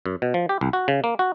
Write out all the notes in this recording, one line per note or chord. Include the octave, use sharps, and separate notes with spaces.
F#2
B2
F3
G4
C2
F#4
C#3
A#3
F#4